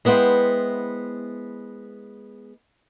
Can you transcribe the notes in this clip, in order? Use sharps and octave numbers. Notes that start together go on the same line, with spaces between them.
G#3 B3 E4 C5 G5